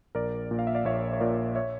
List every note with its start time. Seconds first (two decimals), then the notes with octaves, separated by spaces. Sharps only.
0.15 A#1 A#4 D5
0.51 A#2
0.59 F5
0.67 E5
0.75 D5 F5
0.85 A#1 C#5 E5
1.13 C#5
1.20 A#2 A#4 D5
1.55 C#5 E5